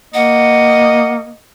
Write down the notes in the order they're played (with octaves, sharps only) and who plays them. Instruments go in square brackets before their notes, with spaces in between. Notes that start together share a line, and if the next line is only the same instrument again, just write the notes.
[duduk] A#3 [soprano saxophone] D#5 [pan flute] F#5